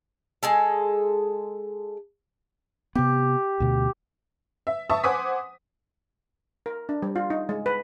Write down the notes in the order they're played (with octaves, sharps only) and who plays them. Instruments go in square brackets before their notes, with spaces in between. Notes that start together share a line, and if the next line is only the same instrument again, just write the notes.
[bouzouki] G#3 G#4 A4
[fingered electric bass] C3 B3 [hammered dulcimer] G4
[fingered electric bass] D2 B2
[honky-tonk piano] E5
E5 A5 C#6 D#6
C5 F#5 G#5 D6 D#6 B6
[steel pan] A#4
D4
G3
F4
D#4
G#3
B4